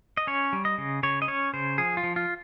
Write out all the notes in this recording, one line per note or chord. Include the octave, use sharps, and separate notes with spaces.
D#5
C#4 C#5
G3
D#5
C#3
C#3 C#5
D#5
C#4 C#5
C#3 C5
F3 G#4
F4
F3
F4